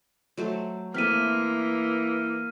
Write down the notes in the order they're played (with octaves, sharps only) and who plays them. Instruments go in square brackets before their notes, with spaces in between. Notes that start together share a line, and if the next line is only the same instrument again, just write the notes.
[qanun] F#3 A3 C5
[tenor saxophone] E3 [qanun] A3 C4 [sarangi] A#3 [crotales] F6 B6 D#7